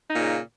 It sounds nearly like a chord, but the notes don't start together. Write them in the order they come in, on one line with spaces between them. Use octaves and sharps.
D#4 A#2 C#3